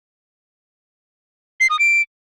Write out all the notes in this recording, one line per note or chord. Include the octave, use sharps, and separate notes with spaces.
C7
D#6
D7